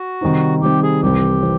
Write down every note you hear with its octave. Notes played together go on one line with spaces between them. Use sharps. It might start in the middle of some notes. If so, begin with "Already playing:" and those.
Already playing: F#4
C3 D#3 G3 C4 D#4
C3 D#3 G3 C4 D#4 G4
G#4
C2 C3 E3 G3 C4 G4
E3 C4